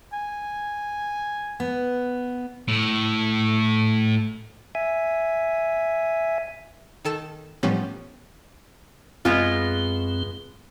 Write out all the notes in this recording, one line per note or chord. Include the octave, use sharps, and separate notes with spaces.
G#5
B3
A2 E4
E5 G#5
D#3 A4 A5
A2 E3 F3 G3 B3 C#4
F#2 G#3 B3 C4 F4